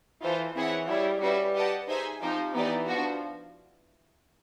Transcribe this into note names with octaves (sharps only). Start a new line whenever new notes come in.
E3 F4 A4 C5
E3 C4 E4 G#4 C#5 F#5
G3 E4 G#4 C#5
G3 C#4 F#4 B4 E5
G4 B4 D#5 F#5 A5
D#4 G#4 C5 E5 G#5
F3 C4 D#4 G4 C5
E3 B3 D#4 G4 B4 D5
F3 B3 D4 F#4